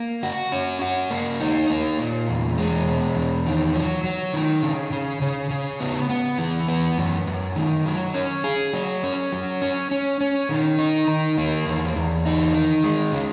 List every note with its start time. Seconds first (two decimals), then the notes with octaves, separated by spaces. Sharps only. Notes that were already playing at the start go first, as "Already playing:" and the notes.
Already playing: A#3
0.23 F#4
0.52 C#4
0.82 F#4
1.11 A#3
1.41 D#4
1.70 A#3
1.99 A#2
2.29 E2
2.58 G#3
2.88 B2
3.16 E2
3.46 D#3
3.75 F#3
4.04 F#3
4.34 D#3
4.63 C#3
4.92 C#3
5.22 C#3
5.51 C#3
5.80 B3
6.09 B3
6.38 E3
6.68 B3
6.98 F#2
7.27 F#2
7.56 D#3
7.86 F#3
8.14 C#4
8.44 G#4
8.73 F#3
9.03 C#4
9.32 F#3
9.62 C#4
9.91 C#4
10.21 C#4
10.49 D#3
10.79 D#4
11.08 D#3
11.38 A#3
11.66 E2
11.96 E2
12.25 D#4
12.54 D#3
12.84 G#3
13.12 C#3